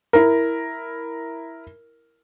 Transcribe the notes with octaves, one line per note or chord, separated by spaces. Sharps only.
E4 A#4